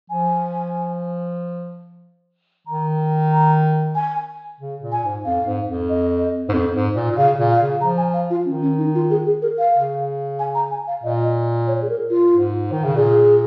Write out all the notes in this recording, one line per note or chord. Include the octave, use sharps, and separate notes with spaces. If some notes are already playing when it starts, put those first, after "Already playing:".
F3 G#5
D#3 A#5
A#5
G#5
C#3
A#2
G#5
G#2
F2 F5
G#2
F2
D#5
G#2
F2
G#2
A#2
A#2
C#3 F5
A#2
F5
C#3
F3 A#5
G#5
F5
F4
D#3 C#4
C#4
D#4
F4
G#4
G#4
A#4
F5
C#3
G#5
A#5
G#5
F5
A#2 D#5
C#5
G#4
A#4
F4
G#2
D#3
C#3
A#2 G#4